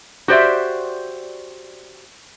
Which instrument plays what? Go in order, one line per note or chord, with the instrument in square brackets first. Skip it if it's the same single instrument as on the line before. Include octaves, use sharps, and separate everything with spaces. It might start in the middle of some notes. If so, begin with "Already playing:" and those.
[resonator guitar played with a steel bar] F#4 G4 C5 D5 E5